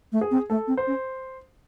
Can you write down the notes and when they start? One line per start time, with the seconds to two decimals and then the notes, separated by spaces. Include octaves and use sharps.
0.12 A3
0.21 G#4
0.31 C4
0.50 A3 A4
0.67 C4
0.77 C5
0.87 C#4